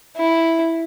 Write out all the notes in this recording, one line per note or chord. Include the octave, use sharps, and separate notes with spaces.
E4